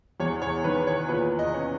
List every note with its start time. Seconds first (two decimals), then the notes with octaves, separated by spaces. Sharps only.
0.20 E2 C#5
0.42 C#5
0.64 D#3 B4
0.87 C#5
1.09 A#2 B4
1.39 D#5
1.54 C#4